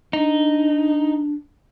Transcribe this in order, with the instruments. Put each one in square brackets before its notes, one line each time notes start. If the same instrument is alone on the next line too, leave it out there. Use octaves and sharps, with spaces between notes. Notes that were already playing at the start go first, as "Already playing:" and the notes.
[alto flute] D4 [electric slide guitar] D#4